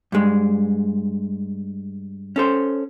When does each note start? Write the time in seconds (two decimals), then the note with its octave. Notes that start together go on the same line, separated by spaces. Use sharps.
0.12 G2 G#3
2.36 C#4 A4 C5